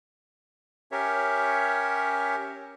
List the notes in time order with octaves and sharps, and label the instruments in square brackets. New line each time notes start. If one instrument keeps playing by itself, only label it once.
[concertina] C#4 G4 A#4 C#5 E5